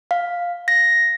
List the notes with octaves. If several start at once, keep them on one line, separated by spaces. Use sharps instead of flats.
F5
A#6